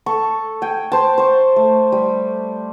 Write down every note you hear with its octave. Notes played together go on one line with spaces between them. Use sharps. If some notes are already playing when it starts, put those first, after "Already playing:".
A4 C#6
G5 G#5
C5 A5
C5 C#6
A3
G3